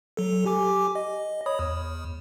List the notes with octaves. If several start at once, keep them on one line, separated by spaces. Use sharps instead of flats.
F#3 A4
G4 G#5 D6
D#5
C#5 B5 D#6
E2